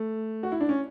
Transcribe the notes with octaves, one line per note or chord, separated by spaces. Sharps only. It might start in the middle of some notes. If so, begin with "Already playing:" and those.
Already playing: A3
F#4
E4
D4
C#4